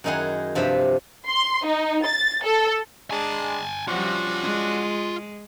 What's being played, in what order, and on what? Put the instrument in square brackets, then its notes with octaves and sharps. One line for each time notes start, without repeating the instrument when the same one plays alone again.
[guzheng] F#2 D#3 D#4 E4 G#4 F#5
G2 C3 F3 B4 E5
[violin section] C6
D#4
A6
A4
[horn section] G#3 D4 [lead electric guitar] G#5 A5
[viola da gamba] F3 G3 [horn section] C#4 D4 F#4 [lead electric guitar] F4 F#5
[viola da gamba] G#3